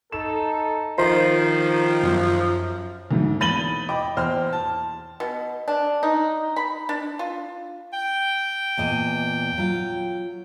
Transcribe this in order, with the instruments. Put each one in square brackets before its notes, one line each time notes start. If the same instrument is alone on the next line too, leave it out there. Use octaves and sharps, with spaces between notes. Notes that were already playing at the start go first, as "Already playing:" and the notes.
[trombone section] D#4 A4 [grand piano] E7
[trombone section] D#3 [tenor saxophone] F3 [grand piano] C5 A#5
[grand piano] F#2
[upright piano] D2 G#2
E2 B5 A6 D#7 F#7 G7
D#5 G5 B5 D6
E2 C5 G5 C6 F6
A5
[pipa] B2
D4
D#4
B5
D4
F4
[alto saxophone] G5
[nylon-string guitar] E2 A#2 D#5
F#3 F4